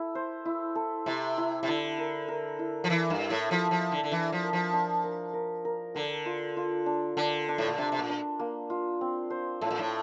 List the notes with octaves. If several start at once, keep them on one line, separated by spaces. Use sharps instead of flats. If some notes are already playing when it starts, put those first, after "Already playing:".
Already playing: E4 A4
C5
E4
A4
C3 E4
E4
C3
D3 E4
A#4
A#4
E4
F3
E3 E4
G2
E5
A2
F3 E4
F3
E5
D3
D3
E3 D4
F3
A#4
F3
D4
A#4
A#4
A#4
D3 A#4
F4
F4
D4
D3 D4
D4
A2
A#2
C3 D4
C3
A#2
D4
A#3
F4
C4
C5
A2 A4
A#2
A2